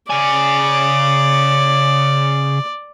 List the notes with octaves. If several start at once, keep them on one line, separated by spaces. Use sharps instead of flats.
C#3 D5 G#5